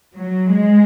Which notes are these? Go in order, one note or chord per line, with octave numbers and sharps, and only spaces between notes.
F#3
G#3